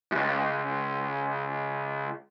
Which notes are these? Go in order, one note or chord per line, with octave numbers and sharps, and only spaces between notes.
C#2 F#2